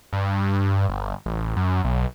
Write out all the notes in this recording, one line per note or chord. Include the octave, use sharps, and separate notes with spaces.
G2
G1
A1
F#2
B1